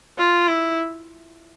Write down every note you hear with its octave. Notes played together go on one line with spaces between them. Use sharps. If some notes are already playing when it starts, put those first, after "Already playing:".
F4
E4